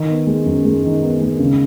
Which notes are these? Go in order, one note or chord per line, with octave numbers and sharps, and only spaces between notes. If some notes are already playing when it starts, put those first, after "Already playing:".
Already playing: D#3
B3
G#3
F#2
G#3
D#3
B3
G#3
C#3